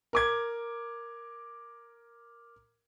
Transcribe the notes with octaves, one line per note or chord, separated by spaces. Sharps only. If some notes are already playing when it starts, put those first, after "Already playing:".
A#4 D6 G#6